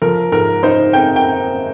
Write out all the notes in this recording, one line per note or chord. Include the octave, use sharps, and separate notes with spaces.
F3 A#4
G#2 A#4
D#4 C5
C4 G5
G5